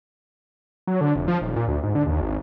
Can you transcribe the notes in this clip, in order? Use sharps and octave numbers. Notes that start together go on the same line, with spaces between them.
F#3
D3
F1
F3
D#1
A#2
D2
G#2
D3
D#2
G#1